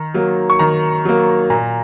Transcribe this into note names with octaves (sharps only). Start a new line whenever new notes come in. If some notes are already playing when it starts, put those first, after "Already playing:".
Already playing: D#3 A#5
F#3 A#3
C#6
D#3 A#5
F#3 A#3
A#2 A#5